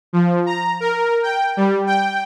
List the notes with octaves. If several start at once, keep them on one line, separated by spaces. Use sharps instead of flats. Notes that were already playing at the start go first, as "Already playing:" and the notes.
F3
A#5
A#4
G5
G3
G5